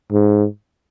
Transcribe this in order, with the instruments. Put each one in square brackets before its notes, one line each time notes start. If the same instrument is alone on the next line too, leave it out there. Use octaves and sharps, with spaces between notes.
[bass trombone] G#2